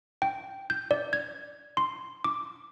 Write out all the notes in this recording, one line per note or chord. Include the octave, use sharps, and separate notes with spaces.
G5
G6
D5
G#6
C6
D6